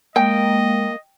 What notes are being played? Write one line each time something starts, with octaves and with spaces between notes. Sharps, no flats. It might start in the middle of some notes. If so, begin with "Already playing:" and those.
G#3 A#3 D#5 G5